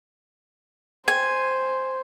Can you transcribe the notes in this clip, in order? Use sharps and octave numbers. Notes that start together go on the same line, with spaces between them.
C5 G#5